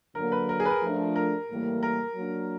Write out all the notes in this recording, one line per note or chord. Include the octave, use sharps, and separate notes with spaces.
D3 F#3 A#3 A#4
B4
A#4
G#4
B4
A#4
F3 A3 D4
A#4
A2 E3 G3 A#3
A#4
F#3 A#3 D4